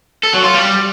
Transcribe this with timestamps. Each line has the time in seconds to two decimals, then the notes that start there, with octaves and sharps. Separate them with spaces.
0.23 A4
0.34 F#3
0.44 F4
0.54 G3